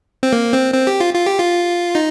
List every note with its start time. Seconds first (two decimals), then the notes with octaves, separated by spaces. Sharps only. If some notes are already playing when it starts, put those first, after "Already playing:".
0.23 C4
0.33 A#3
0.53 C4
0.74 C4
0.87 G4
1.00 F4
1.14 F4
1.26 G4
1.40 F4
1.95 D#4